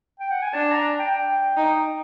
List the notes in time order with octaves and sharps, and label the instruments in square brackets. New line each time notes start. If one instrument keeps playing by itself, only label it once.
[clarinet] G5
F#5
G#5
[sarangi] D4 [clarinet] A5
[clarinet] A#5
G5
G5
[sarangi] D#4